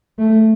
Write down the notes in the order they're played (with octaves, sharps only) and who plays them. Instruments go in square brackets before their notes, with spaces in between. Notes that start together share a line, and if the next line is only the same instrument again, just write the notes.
[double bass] A3